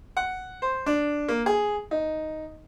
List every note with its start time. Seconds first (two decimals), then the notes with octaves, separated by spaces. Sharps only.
0.17 F#5
0.62 C5
0.86 D4
1.28 A#3
1.46 G#4
1.91 D#4